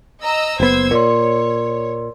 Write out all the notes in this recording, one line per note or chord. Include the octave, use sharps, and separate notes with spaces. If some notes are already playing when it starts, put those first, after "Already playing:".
D#5 A#5 E6
F#1 B3 C5 E6 G#6
A#2 A#4 C#5 D5 C6